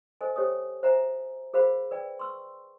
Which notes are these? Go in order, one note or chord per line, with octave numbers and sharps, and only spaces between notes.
A4 C5 D#5 G#5
G4 C5 C#5 D#5 G5 D#6
C5 E5 F#5 G#5 A#5
G#4 A#4 C5 F5 F#5 B5
B4 D5 G5
C6 C#6 E6